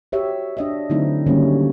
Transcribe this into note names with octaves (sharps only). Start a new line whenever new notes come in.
F#4 G4 C#5 E5
D4 D#5 E5
D3 F#3 A3 C4 D#4 E4
D3 D#3 F#3 G3 A#3 C#4